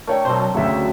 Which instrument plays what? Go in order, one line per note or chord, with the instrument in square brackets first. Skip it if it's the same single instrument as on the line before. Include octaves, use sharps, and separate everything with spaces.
[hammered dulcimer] A3 D4 [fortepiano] A#4 C#5 G5
[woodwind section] B2 F#3 [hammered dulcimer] C4 [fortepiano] C5
[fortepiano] D2 C#3 [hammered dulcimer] F#3 [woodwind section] E5